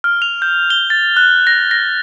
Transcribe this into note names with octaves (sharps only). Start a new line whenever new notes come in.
F6
F7
G6
G7
A6
F#6
A#6
A#6